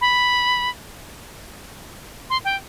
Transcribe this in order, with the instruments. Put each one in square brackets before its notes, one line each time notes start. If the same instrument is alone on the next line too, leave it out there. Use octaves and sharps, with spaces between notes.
[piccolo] B5
C6
G5